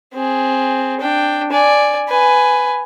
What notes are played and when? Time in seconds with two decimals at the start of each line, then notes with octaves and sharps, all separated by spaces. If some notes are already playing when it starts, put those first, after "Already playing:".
0.14 C4 G#4
1.00 D4 G5
1.51 D5 G#5
2.09 B4 G#5